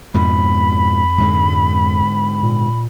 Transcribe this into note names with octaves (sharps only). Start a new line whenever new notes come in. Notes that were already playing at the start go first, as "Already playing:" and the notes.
F2 G#2 B2 F3 B5
G#2 D3 G#3
A#2